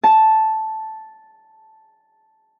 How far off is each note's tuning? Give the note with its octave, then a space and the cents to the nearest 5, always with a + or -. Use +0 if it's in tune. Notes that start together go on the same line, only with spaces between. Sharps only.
A5 -5